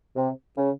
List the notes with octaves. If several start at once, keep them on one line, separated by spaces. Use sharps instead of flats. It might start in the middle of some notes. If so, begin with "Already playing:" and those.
C3
C#3